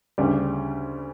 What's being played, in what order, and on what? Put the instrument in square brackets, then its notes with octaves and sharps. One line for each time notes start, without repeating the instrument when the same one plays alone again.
[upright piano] D2 C#3 G3